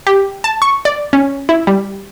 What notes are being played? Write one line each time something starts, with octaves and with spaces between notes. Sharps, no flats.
G4
A5
C#6
D5
C#4
E4
G3